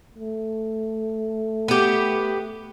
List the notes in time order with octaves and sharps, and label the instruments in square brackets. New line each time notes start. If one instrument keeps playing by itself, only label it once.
[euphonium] A3
[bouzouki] B3 G4